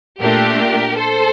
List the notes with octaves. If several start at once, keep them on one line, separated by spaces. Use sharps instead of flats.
A#2 A3 D4 G4 A#4
A4 C5